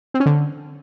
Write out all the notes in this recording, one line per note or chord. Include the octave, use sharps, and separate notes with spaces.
C4
C#4
D3